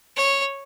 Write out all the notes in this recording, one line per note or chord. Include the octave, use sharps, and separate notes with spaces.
C#5